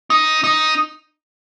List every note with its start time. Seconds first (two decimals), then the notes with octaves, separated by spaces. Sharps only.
0.10 D#4
0.44 D#4